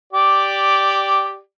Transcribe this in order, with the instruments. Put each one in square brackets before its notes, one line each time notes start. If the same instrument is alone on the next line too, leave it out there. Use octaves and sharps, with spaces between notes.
[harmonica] G4 D5